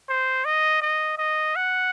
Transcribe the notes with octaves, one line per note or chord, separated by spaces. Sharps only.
C5
D#5
D#5
D#5
F#5